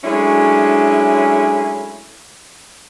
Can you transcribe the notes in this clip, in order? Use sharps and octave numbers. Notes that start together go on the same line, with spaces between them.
F#3 G#3 A3 C#4 D4 E4